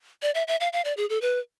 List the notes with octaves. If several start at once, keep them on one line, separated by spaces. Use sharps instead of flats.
D5
E5
E5
F5
F5
D5
G#4
A4
B4